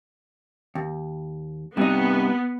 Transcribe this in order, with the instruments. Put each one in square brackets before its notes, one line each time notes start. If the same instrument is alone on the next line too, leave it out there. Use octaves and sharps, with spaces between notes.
[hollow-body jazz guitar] D#2
[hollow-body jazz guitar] G2 D#4 [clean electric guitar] C3 G3 [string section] B3